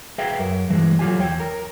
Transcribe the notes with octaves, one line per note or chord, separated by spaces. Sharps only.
G#4 B4 E5 F5 G5
F#2 A#4
G2 E3 G#3
F#3 A3 F4 G4 G#5
E2 C#5 G5
A#4